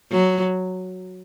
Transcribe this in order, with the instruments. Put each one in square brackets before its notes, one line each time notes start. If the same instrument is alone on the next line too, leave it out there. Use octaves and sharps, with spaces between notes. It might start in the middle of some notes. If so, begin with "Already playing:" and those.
[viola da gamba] F#3